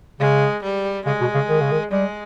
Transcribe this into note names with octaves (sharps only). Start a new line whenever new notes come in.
C#3 G#3
G3
C#3 G#3
B2
C#3
D#3
C#3
D#3
G3 G#3